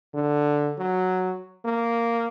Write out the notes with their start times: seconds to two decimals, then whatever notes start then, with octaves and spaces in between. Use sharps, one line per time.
0.15 D3
0.78 F#3
1.65 A#3